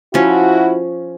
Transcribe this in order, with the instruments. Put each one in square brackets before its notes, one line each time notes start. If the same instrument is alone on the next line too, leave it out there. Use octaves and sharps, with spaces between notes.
[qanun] F3 C#4 [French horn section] E4 F#4